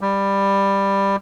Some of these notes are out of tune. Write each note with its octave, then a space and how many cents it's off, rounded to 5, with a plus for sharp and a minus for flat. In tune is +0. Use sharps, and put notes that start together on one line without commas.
G3 +10